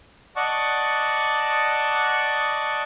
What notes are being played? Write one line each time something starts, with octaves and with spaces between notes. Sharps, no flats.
D5 D#5 F#5 A5 C#6